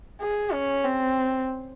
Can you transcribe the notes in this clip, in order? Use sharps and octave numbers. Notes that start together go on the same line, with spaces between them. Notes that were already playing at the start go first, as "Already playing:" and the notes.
G#4
C#4
C4